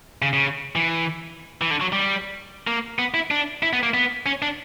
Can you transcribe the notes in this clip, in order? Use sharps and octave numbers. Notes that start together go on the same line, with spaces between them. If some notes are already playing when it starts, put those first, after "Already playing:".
C#3
C#3
E3
E3
D3
F#3
G3
A#3
B3
E4
D4
E4
B3
A#3
B3
C#4
D4